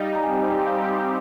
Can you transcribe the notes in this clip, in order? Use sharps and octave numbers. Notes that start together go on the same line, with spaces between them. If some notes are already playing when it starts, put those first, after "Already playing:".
Already playing: G3 D#4 D#5 F5 G5
A#5
G3 C4 D#4 G4 G#5
F5